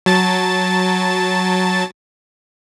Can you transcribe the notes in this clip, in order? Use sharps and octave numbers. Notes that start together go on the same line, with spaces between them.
F#3 A5 A6